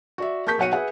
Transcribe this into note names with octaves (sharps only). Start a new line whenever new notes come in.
F#4 D5 E5
A#3 G#4 A5 C#6 G6 B6
B1 F#4 C#5 F#5 C#7 D#7
G#4 B4 E5 F#5 G#5